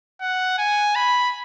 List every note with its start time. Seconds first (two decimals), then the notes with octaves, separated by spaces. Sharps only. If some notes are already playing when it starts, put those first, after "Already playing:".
0.21 F#5
0.58 G#5
0.95 B5